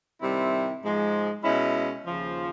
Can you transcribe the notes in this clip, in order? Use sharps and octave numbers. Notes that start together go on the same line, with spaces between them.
C3 D#3 G3 C4 E4
G#2 F3 G#3
B2 G#3 C#4 E4
D#2 C#3 F3